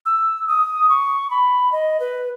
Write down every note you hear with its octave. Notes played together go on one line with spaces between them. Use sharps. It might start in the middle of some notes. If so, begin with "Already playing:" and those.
E6
D#6
C#6
B5
D#5
B4